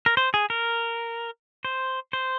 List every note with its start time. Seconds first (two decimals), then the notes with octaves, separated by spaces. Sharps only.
0.06 A#4
0.17 C5
0.34 G#4
0.50 A#4
1.65 C5
2.13 C5